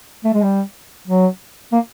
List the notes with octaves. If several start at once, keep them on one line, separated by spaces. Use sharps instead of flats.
A3
G#3
G3
F#3
A#3